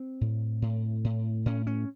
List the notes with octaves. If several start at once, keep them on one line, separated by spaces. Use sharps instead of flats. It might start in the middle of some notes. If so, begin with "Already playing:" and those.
Already playing: C4
A2
A2
A2
A2 C#4
C#4